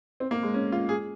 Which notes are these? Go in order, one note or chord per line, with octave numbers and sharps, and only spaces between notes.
C4
A#3
G#3
C#4
F4
G#4